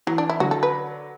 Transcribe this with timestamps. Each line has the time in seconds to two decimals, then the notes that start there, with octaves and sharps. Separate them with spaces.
0.07 E3 F#3
0.18 D4
0.30 E4
0.40 D3 F#3 F#4
0.51 A4
0.63 B4